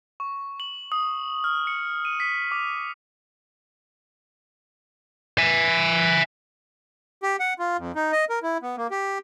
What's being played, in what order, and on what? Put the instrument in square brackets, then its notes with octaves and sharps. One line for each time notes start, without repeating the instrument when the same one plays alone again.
[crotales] C#6
F#7
D#6
F6
C#7
D#7
B6
D6
[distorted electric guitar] E5 G#5
[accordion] G4
F#5
F4
F2
D#4
D#5
A#4
E4
B3
A#3
G4